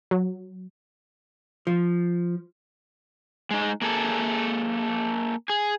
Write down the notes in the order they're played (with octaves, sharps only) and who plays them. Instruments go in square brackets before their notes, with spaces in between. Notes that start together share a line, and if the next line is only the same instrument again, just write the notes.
[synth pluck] F#3
[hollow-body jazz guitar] F3
[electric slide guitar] G#3 D#4
A#3 G#4 A4
G#4